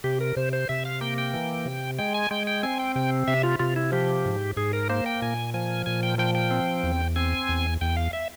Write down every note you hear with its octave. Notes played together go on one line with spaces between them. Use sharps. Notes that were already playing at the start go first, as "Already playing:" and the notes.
C3 G4
A#4
C3 C5
C5
C3 E5
F5
A#3 G5
G5
E3
C3
G#3 G5
G#5
G#3 G5
G5
C4 G#5
G5
C3 G5
C3 E5
F4
C3 F4
E4
F3 G4
G#2
G#2 G#4
A#4
A#3 C5
G5
A#2 G#5
F3 G#5
A#2 G#5
G5
F3 G5
G5
C4
E2
C4 G#5
E2
E2 G5
F5
E5